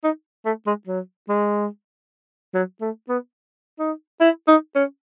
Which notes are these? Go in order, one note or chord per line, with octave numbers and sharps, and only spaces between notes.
D#4
A3
G#3
F#3
G#3
F#3
A3
B3
D#4
E4
D#4
C#4